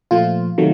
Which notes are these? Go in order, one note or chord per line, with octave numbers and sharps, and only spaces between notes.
A#2 F3 A3 F4
C3 D#3 F#3 A3